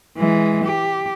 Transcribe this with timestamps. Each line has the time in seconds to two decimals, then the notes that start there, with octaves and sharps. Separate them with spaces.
0.18 E3 G#3
0.64 G4